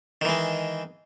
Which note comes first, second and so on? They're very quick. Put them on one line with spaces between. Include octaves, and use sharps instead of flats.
D#3 E3 G#3